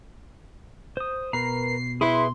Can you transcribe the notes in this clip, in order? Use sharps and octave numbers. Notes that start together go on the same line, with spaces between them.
C5 D#6
B2 A#4 B4 A#5 C7
E4 G#4 B4 E5 C6